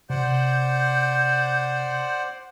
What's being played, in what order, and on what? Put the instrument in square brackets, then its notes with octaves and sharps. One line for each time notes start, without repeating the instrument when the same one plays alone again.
[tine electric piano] C3 [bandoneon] C5 D5 F#5 [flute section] G6